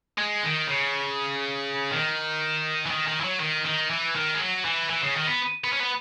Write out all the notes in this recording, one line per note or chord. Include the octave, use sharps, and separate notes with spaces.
G#3
D#3
C#3
D#3
E3
D#3
D#3
E3
F#3
D#3
D#3
E3
D#3
G#3
F#3
E3
E3
C#3
D#3
B3
B3
C#4
B3